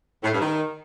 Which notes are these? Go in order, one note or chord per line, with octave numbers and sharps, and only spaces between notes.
A2
G2
D#3